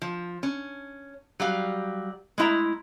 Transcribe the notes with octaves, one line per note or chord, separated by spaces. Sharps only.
F3
C#4
F#3 G3 F5
G#3 A3 E4 E5 A#5